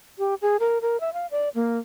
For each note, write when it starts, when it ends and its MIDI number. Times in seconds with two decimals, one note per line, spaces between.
0.18 0.34 67
0.42 0.57 68
0.60 0.78 70
0.82 1.00 70
1.00 1.13 76
1.13 1.26 77
1.31 1.49 74
1.55 1.78 58